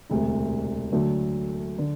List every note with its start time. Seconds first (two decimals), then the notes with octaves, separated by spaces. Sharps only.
0.10 E1 D2 C3
0.92 D2 D3 F#3 A3
1.78 D3